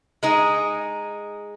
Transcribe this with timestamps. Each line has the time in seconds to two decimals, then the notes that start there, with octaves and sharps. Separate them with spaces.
0.23 G#3 D#4 G#4